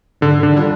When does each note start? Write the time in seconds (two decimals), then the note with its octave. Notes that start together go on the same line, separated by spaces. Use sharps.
0.21 G#2 D3
0.43 D3
0.53 D#3 G3 D4 F4